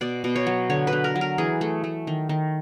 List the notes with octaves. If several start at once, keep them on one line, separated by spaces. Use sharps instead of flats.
B2 D5
B2
C#5
F#3
D3 C#5
B4
D3
A#4
F#3
A#4
E3 G#4
A3
A3
D#3
D#3